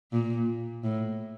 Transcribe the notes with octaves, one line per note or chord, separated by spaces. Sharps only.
A#2
A2